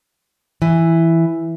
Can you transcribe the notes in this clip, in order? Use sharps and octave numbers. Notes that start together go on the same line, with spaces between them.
E3